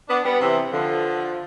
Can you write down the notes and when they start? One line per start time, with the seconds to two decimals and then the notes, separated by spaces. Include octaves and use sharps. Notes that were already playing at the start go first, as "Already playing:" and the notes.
0.09 B3 D4
0.25 G3 B3
0.41 C3 E3
0.73 D3 F3